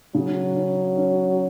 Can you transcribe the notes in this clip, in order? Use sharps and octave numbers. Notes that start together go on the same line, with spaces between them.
C#3 F#3
C#4
C#4